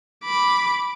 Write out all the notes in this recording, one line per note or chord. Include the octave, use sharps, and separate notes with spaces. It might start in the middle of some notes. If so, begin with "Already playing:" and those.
B5 D6